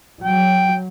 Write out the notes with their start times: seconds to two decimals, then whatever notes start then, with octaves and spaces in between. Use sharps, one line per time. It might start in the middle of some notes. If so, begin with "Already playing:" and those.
0.24 F#3 G5